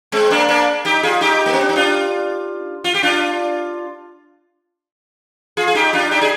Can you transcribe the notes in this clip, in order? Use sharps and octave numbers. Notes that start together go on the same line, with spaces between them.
G#3 C4
A#3 D4
A#3 D4
D#4 G4
F4 G#4
D#4 G4
A#3
C4
D4
D#4
D4 F4
F4
G4
D4 F4
F4 G#4
G#4
D#4 G4
D4 F4
D#4 G4
G#4